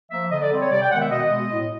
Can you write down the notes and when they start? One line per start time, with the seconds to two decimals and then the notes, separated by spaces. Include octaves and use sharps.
0.11 F3 A#3 E5
0.31 D3 D#5
0.41 D5
0.51 G3 C4
0.60 C#5
0.71 C3 D5
0.81 G5
0.91 D#3 G#3 B3 F#5
1.01 E5
1.10 B2 D#5
1.31 G#3 B3
1.50 A2